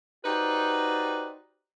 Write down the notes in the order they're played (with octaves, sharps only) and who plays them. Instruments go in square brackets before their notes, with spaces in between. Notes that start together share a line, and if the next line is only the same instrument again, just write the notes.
[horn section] D#4 F#4 G4 B4 C5 D5